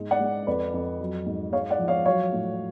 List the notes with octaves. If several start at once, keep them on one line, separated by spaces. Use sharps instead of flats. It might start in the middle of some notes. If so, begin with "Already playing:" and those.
Already playing: G#2 G#3
D5 F#5
G#3
F2 B4 D5
F2
F#3
G#2
G#3 C#5 F5
D5 F#5
F3
C#5 F5
F#3 C#5 F5
A2